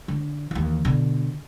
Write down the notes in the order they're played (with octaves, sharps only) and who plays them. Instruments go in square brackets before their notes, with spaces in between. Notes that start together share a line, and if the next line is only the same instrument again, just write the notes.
[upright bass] D3
D#2 E3
B2 D3